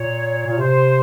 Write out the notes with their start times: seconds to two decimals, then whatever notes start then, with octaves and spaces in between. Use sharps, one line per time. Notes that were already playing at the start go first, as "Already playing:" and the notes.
Already playing: A#2 C#5
0.46 A#2 C#5
0.58 C3 C5